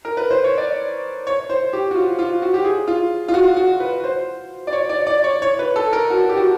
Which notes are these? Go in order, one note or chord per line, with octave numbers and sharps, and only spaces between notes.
A#4
B4
C5
C#5
D5
C#5
C5
G4
F#4
F4
F4
F#4
G4
G#4
F4
F4
F#4
F#4
B4
C5
D5
C#5
D5
D5
C#5
C#5
B4
A4
A#4
F#4
G4
F#4